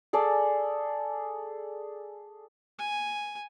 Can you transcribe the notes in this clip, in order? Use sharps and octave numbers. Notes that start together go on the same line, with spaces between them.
G#4 A4 D5
G#5